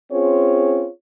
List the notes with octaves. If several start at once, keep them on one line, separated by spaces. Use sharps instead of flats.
C4 C#4 F4 G#4 C#5